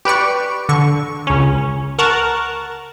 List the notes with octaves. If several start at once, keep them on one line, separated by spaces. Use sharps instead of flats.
G4 B4 D5 C#6
D3 C#6
C#2 C#4
A#4 F#5 A5 A#5 C#6